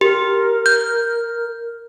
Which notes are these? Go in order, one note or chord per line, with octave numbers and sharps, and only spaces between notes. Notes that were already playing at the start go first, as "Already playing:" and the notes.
G4 A#4
G6